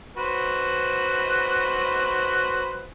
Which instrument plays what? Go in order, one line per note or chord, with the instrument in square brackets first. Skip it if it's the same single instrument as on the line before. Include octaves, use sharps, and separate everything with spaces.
[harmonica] F#4 B4 C5